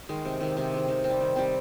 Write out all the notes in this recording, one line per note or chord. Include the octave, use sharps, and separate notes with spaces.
D#3 G#3
C3
D#3 G#3
C3
D#3 G#3
D#3
C4
G3
D#3
G3 C4